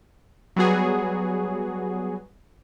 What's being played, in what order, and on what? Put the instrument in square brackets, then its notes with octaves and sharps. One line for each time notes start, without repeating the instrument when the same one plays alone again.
[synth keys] F#3 G3 B3 F#4 G#4